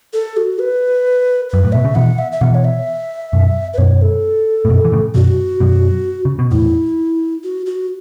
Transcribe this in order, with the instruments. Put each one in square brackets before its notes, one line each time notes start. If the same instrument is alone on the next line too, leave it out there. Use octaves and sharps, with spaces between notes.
[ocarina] A4
F#4
B4
[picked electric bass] F#2 [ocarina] B4
[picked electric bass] A2
[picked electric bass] B2 [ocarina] E5
[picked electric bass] C#3
[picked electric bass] B2 E3 [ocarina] F#5
[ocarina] E5
E5
[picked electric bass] B2 E3 [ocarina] F#5
[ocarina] C#5
E5
[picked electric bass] F#2 B2
[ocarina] B4
[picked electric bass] F#2 B2 [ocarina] C#5
[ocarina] A4
[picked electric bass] A2
F#2 B2
E3
A2 C#3
[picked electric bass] F#2 B2 [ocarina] F#4
[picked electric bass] F#2 B2
C#3
B2
[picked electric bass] E2 A2 [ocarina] E4
[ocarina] F#4
F#4